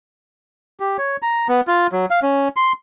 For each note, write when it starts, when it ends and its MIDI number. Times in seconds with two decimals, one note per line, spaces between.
0.80 0.97 67
0.98 1.17 73
1.22 1.47 82
1.48 1.61 59
1.67 1.87 65
1.92 2.06 54
2.10 2.20 77
2.23 2.48 61
2.56 2.73 84